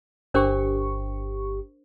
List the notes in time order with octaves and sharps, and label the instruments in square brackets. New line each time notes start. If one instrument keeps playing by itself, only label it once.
[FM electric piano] G1 G4 C#6 [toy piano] D4 A#4 C5